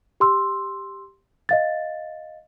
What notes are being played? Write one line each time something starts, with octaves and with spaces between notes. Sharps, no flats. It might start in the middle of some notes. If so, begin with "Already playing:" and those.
G4 C6 E6
D#5 F5 A6